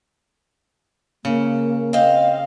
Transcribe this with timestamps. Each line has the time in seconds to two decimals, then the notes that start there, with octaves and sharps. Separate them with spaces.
1.25 C#3 A#3
1.93 C4 D#5 F5